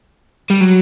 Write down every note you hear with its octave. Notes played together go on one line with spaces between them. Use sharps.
G3
F#3